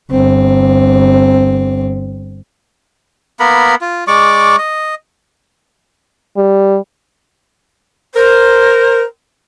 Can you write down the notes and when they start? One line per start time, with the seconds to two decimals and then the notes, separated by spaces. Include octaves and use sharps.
0.11 G1 C4
3.40 A#3 B3 A#4 B5
3.81 F4
4.08 G#3 D5 C#6 D6
4.58 D#5
6.37 G3
8.15 A#4 C5